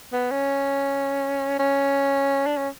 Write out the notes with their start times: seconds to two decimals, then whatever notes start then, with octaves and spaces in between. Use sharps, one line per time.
0.12 B3
0.31 C#4
1.59 C#4
2.46 D4
2.58 C#4